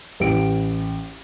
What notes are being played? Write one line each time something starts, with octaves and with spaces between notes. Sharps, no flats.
A1 G4 D7